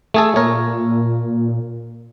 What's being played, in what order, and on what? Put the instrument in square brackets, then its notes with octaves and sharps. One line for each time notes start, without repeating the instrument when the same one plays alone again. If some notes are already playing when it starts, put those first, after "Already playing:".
[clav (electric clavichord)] A3 G#4 A4
[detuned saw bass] A#2 [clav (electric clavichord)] A#4 C#5